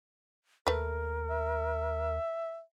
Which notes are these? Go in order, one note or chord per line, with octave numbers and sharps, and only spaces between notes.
D#2 A3 A#4 B4
E5